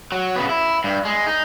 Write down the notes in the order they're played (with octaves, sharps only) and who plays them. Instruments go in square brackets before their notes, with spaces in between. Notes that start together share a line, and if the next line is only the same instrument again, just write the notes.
[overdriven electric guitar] F#3
C#3 B3
E4
G2
G#3
D#4